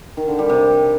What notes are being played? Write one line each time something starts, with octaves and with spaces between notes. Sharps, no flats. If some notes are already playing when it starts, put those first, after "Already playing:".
D#3
D3
G3
C3